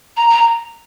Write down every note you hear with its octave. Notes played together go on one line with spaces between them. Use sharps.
A#5
A#5